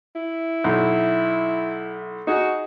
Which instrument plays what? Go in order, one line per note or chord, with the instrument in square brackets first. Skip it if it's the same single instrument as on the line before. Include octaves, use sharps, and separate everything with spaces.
[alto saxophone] E4
[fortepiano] B1
[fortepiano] D#4 G#4 [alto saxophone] F#4